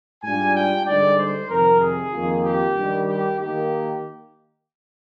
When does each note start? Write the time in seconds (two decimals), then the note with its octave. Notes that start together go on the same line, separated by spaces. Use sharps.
0.22 G#2 G3 D4 F4 G#5
0.55 G5
0.86 G2 D3 G#3 D#4 D5
1.17 C5
1.49 F2 C3 D#3 A#4
1.80 G#4
2.12 F2 D#3 A#3 F4
2.44 G4
2.75 G2 D#3 G3
3.07 G4
3.39 D#3 A#3 D#4 G4